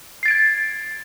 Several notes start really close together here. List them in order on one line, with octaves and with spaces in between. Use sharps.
C7 A6 D7 G#6